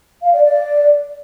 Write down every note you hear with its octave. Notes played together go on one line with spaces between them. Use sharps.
F5
D5
D5